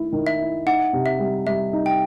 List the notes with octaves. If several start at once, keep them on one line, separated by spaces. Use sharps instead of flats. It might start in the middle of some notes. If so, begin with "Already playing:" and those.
Already playing: D#3 A3 E4
D#3
E5
E4
D#4 F#5
C3
E5
G3
G3 E5
D#4
G5